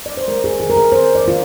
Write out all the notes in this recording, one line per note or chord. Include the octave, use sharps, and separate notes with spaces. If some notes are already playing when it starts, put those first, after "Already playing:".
D5
C5
G#3 A#4
G#4
D#3 G#4
A#4
G#4
C4 C5
D5
D#3 F4